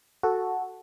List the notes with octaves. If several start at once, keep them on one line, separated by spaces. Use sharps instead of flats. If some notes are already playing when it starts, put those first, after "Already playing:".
F#4 A4